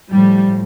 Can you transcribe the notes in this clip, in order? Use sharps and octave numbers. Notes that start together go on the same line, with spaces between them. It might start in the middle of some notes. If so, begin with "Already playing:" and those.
A2 F3 G3